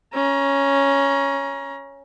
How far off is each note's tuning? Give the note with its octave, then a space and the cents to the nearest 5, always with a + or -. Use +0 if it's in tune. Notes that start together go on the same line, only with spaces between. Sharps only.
C#4 +0 A#5 +30